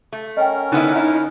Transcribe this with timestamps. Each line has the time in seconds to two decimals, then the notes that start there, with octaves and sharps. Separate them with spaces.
0.13 A3
0.37 C#4 A#4 D#5 F#5 G5
0.72 D3 B3 D#4 E4 F#6
0.96 E4